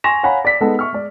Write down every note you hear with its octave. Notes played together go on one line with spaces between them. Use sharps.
G#5 C6 C#6 A#6 E7 F7
C#5 F5 F#5 G#5 A#5 B5
D5 B6
G#3 B3 D#4 A4 F#5
E5 C#6 F6
G#3 D5